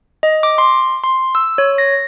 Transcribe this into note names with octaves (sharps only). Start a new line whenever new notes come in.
D#5
D6
C6
C6
E6
C#5
A#6